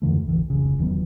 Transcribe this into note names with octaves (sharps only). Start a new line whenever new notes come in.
F2 D3 E3 A3
D1 A#1 D3 E3
F1 C#2 C#3
E1 D#3 F#3 B3